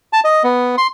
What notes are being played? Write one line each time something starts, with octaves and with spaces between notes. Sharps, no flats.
A5
D#5
B3
C6